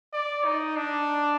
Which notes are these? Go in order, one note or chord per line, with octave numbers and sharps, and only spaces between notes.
D5
D#4
D4